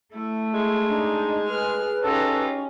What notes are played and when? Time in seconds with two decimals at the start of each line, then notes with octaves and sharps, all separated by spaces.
0.14 A3 E4
0.54 G#3
0.87 D4 D#4
1.48 G#4 B4 F6
2.03 C#4 D#4 F4 G4 A4